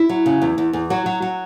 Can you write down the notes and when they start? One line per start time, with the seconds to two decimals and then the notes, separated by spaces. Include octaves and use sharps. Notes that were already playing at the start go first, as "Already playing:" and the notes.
Already playing: E4
0.09 F#3
0.26 C#3
0.42 E2
0.58 E2
0.73 E2
0.90 F#3 F#4
1.06 F#3
1.22 F#3